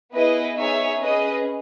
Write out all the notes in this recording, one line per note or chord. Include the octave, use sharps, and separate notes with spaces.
B3 E4 G#4 B4 D#5
D#4 G#4 C#5 E5
C#4 G#4 B4 D#5